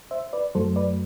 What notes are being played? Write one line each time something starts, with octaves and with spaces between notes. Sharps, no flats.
C5 E5
B4 D5
F#2 F#3 A3 A4 C5
B4 D5